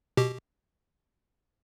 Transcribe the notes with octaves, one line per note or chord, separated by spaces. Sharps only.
B2 G4